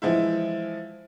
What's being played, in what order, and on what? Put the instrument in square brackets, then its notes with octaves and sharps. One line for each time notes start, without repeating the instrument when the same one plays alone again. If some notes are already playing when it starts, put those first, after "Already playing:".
[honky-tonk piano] E3 F3 G#3 E4